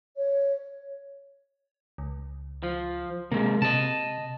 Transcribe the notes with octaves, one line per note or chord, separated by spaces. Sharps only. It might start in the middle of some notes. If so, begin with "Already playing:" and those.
C#5
C#2
F3
C3 G#3 A#3
C3 D#5 A5